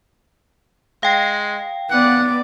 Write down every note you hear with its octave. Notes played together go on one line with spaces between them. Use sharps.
G#3 F5 G5
B3 D5 F#5